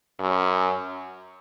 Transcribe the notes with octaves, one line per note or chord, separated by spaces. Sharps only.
F#2